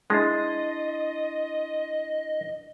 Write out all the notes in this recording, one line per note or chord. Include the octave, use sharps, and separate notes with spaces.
G#3 D4 E4 D#5 A5 C6 A6 C7